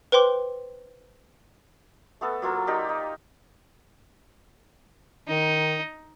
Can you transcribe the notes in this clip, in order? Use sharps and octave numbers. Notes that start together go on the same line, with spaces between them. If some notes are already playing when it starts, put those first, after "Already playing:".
B4 C5 G5 C6 D6
A3 B3 A4
F#3 A#3 F4 A4
D#4 G4 A#4 D5
D#4
D#3 D#4